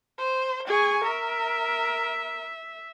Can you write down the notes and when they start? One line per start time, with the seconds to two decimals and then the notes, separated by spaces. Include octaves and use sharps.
0.18 C5
0.67 G#4 G#5 C#6
1.04 A#4 E5